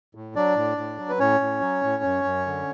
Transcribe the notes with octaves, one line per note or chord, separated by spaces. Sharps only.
A2
F#3 D4 D5
A2
A2
F#3
B4
A2 C#4 C#5
A2
F#3
A2
F#2
F#2
D3